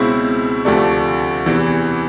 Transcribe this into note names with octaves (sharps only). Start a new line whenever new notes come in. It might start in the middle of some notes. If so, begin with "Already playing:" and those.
Already playing: C#2 B2 G#3 C4 E4
D2 C3 F3 A3 D4
E2 C3 E3